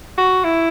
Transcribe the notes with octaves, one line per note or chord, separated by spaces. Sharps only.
F#4
E4